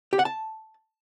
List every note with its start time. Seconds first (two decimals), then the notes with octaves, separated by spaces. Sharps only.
0.13 G4
0.19 F#5
0.25 A5